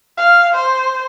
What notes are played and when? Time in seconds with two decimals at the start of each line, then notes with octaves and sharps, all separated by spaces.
0.17 F5
0.54 C5